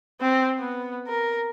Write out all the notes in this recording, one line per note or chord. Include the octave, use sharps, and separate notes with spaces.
C4
B3
A#4